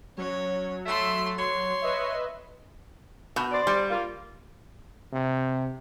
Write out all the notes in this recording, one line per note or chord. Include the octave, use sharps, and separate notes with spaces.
F#3 C#4 C#5
A3 E5 C6
C#5 C6
B4 D#5 E5
B2
C5 D5
G3
A#3 F4
C3